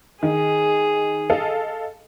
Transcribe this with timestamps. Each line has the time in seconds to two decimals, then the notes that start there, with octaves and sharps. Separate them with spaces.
0.23 D#3 G#4
1.30 A4 D#5 F5